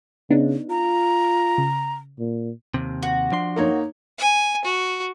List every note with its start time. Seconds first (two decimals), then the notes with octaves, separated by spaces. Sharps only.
0.30 C#3 B3 D4 D#4
0.70 F4 A#5
1.58 C#3
2.19 A#2
2.74 D#2 C3
3.03 F#4
3.32 F3 D4 C6
3.56 A#3 D#4 C#5
4.19 G#5
4.65 F#4